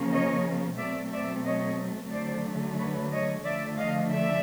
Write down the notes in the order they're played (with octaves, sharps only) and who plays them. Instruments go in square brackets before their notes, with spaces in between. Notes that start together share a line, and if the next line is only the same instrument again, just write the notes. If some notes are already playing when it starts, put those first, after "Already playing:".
Already playing: [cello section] C#3 F3 A#3 C#4
C#5 D#5
B2 F#3 A3 C4 D5 E5
D5 E5
C#5 D#5
D3 F#3 A3 C5 D5
B4 C#5
C#5 D#5
D3 F3 A3 D5 E5
D#5 F5
D5 E5